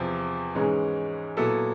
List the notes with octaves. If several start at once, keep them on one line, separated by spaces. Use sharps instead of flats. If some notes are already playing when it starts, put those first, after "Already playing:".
Already playing: E2 C3 F3
G#2 E3 G#3 C#4
A#2 F#3 B3 E4 A4